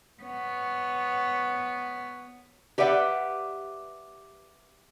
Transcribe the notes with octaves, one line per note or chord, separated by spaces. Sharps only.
B3 C#5
G4 B4 D5 E5 F#5